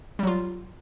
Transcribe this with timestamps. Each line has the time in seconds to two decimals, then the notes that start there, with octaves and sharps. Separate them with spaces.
0.19 G3
0.23 F#3
0.27 F4